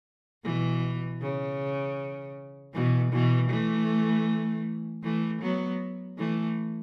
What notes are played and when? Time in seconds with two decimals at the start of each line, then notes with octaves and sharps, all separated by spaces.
0.44 B2 E3
1.21 C#3
2.74 B2 E3
3.12 B2 E3
3.50 E3 A3
5.03 E3 A3
5.42 F#3 B3
6.18 E3 A3